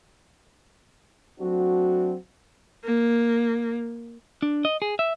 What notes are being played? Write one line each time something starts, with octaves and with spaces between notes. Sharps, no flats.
F#3 A3 C4 D4 F#4
A#3
D4
D#5
G#4
E5